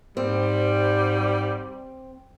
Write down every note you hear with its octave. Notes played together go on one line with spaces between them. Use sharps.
G#2 G3 C4